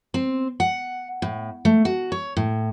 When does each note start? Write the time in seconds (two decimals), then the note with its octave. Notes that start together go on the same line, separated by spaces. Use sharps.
0.14 C4
0.60 F#5
1.22 A2
1.65 A3
1.85 F#4
2.12 C#5
2.37 A2